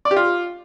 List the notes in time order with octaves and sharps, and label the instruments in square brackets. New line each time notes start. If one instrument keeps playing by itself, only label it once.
[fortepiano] D5
G4
F4